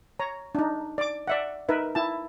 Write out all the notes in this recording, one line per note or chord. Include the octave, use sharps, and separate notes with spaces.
C#5 A#5
D4 D#4
D5 D6
D5 E5 F#5
D#4 A#4 B4 E5
E4 A5